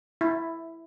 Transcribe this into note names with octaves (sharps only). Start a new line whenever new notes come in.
E4